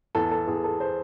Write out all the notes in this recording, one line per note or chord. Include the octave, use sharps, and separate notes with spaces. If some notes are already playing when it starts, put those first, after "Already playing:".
E2 A4
A4
E2 G#4
A4
C5